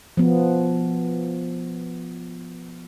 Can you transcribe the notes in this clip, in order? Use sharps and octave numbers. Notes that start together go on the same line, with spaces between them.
F3 B3